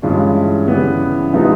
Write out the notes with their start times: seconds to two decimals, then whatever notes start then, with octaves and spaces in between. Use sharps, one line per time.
0.02 G2 E3 G#3 C#4 F4
0.68 C#3 E3 G3 B3
1.33 C3 F3 G#3 B3 D#4